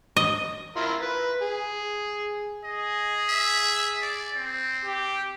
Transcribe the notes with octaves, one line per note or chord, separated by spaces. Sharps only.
D#5
E4 F4 A#4
B4
G#4
G#4 D#5
E5
D5
C4
G4